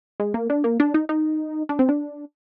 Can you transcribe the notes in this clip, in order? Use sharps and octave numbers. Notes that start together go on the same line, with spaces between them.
G#3
A#3
D4
A#3
D4
D#4
D#4
D4
C4
D4